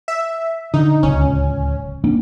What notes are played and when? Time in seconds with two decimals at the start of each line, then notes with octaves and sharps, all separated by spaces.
0.08 E5
0.74 D3 D#4
1.03 D1 C#2 C#4
2.04 A#3 C#4 D4